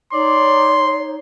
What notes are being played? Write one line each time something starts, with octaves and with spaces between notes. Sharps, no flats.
D#4 C#5 D5 C6